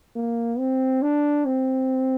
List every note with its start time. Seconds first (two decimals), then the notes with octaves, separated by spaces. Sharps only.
0.16 A#3
0.59 C4
1.02 D4
1.45 C4